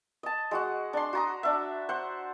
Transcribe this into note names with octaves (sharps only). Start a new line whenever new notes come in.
D#5 A5
G#3 F#4 F#5
D4 C6
F#4 A#5 D#6
D4 E5
C5 F#5